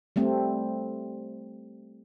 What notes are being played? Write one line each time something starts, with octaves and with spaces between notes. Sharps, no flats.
G3 A3 C4